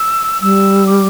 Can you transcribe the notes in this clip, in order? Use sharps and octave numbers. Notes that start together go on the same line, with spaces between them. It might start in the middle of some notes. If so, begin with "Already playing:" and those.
Already playing: E6
G3 E6
D6